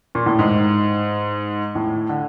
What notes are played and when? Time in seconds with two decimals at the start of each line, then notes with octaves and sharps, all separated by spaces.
0.15 A#2
0.26 A2
0.39 G#2
1.75 A2
2.09 D3